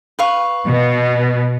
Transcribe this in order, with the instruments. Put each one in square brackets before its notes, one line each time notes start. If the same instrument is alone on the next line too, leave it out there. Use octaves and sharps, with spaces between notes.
[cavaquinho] B4 F5 C#6
[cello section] B2